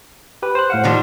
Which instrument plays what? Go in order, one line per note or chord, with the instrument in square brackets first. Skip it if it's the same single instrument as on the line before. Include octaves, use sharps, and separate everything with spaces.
[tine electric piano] G4 B4
C5 F#6
A2 F5 F#5
[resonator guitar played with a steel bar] D#3 F3 G3